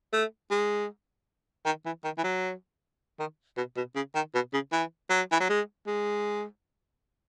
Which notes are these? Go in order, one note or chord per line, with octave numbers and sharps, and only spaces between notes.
A3
G#3
D#3
E3
D#3
E3
F#3
D#3
B2
B2
C#3
D#3
B2
C#3
E3
F#3
E3
F#3
G#3
G#3